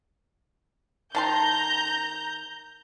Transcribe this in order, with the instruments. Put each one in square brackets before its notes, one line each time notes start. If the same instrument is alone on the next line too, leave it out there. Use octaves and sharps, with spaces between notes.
[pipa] D#3 A5 C6 [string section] A#5 G6